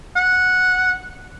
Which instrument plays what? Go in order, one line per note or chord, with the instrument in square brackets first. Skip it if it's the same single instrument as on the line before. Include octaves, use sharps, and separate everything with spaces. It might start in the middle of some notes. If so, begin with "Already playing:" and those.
[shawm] F#5